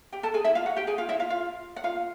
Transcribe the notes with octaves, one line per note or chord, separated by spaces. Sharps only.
G4 G5
A4 A5
G#4 G#5
E4 E5
F4 F5
F#4 F#5
G4 G5
G#4 G#5
F4 F5
E4 E5
F4 F5
F4 F5
F#5
F4 F5